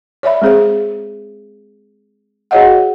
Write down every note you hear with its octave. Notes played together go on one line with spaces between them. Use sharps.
C#5 D5 E5 B5
G#3 C4 G#4 C5 F5
F#4 G#4 C#5 D#5 F5 F#5